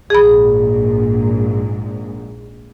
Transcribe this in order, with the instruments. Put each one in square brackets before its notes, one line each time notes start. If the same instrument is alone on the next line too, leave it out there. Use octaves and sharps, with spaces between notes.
[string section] A#1 G#2 [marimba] G#4 B5